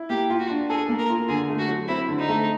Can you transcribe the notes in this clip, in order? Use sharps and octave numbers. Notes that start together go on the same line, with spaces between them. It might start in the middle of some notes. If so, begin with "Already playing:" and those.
Already playing: E4
A#3 G4
F4
F#4
D4
G#4 A4
A#3
A#4
F4
D3 G#4
A3
F#4
F#3
C4 E4
D3
D#4
A3